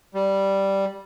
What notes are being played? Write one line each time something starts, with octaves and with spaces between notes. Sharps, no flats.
G3